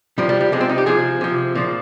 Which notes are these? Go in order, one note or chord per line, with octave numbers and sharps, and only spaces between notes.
C3 F3 G3
G3
G3
C3 F3 G#3
C4
D#4
G4
C3 F3 G#4
C3 F3
A#2 F3